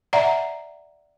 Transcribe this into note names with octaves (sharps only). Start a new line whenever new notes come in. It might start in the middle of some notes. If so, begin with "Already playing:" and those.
D5 E5 F#5 A#5